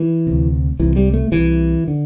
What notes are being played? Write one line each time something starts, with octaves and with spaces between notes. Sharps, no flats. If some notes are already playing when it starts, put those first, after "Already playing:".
Already playing: E3
D2 C3
C2 C3 E3
G3
A3
C2 C3 E3
D3